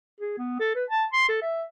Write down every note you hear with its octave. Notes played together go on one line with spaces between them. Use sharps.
G#4
B3
A4
B4
A5
C6
A4
E5